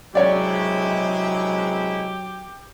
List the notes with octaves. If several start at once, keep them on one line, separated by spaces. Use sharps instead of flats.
C3 F#3 G#3 E4 G4 C#5 D5